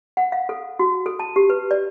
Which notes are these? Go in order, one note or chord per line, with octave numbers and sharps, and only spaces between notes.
F#5
F5
A4
F#4
A4
A5
G4
B4
D5